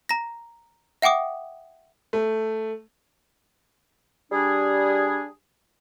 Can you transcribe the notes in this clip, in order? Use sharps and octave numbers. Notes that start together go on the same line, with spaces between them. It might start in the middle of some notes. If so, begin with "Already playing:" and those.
A#5 A#6
E5 F#5 G5 D6 D#6
A3
G3 D4 G#4